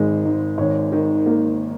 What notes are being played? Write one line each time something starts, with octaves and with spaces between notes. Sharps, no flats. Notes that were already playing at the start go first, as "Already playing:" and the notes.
Already playing: G#1 D#3 G#3
G#2
G#1 C#5
D#3
A#3